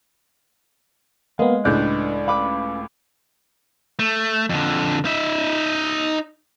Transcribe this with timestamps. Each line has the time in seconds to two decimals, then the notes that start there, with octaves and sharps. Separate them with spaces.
1.39 G#3 A#3 B3 F5
1.65 C#2 A2 D4 B4 D5 F#6 G6
2.28 C#4 B4 F5 B5 D6
3.99 A3
4.49 F2 D3
5.05 D#4 E5